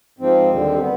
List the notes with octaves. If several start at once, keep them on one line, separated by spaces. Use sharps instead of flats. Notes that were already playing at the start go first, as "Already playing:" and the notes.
G#2 F3 C4
D#2 D3 G3
B3